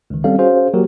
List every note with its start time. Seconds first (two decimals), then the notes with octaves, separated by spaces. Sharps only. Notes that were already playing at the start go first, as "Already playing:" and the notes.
0.10 C#2 D#3
0.24 G3 C4 C#4 A4 F5
0.38 C#4 F#4 G#4 C5 F5
0.74 F#3 A#3 F#4 G4 A#4